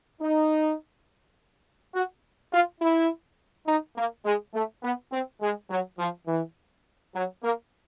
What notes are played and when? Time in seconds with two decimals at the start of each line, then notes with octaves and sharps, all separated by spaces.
0.21 D#4
1.94 F#4
2.52 F4
2.81 E4
3.67 D#4
3.97 A#3
4.25 G#3
4.54 A3
4.83 B3
5.12 C4
5.41 G#3
5.70 F#3
5.99 F3
6.27 E3
7.15 F#3
7.43 A#3